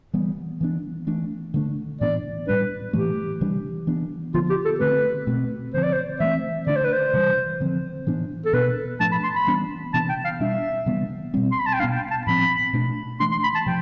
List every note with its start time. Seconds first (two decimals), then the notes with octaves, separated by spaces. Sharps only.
0.14 E3 G3 B3
0.61 E3 B3 D4
1.07 E3 A3 D4
1.54 D3 A3 D4
2.01 A2 E3 B3 D4 D5
2.47 A2 G3 D4 B4
2.93 A2 E3 A3 G4
3.41 C3 E3 G3 D4
3.87 E3 B3 D4
4.34 D3 F3 B3 F4
4.50 G4
4.65 A4
4.80 D3 A3 C4 B4
5.27 B2 A3 C4
5.73 D3 F3 C4 C5
5.83 D5
5.93 C5
6.20 E3 A3 C4 E5
6.67 D3 A3 D4 D5
6.76 C5
6.84 B4
6.92 C5
7.13 C3 E3 G3
7.60 D3 F3 C4
8.07 A2 E3 B3 D4
8.45 A4
8.53 B2 B3 D4 B4
9.00 A2 F3 A3 D4 A5
9.12 B5
9.23 C6
9.35 B5
9.47 E3 G3 B3 D4
9.93 C3 E3 B3 D4 A5
10.09 G5
10.24 F5
10.40 B2 G3 D4 E5
10.86 C3 E3 G3 B3
11.34 B2 G3 C4
11.51 C6
11.59 B5
11.66 A5
11.73 G5
11.79 B2 B3 D4 F5
11.95 G5
12.11 A5
12.27 A2 F3 C4 B5
12.73 B2 A3 D4
13.20 E3 A3 D4 C6
13.31 C6
13.43 B5
13.55 A5
13.66 C3 F3 G5